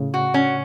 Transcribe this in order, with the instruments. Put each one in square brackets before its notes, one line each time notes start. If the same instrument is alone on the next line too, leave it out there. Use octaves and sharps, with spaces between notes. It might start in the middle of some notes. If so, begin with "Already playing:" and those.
Already playing: [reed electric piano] A2 C#3
[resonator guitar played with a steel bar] F#4
C#4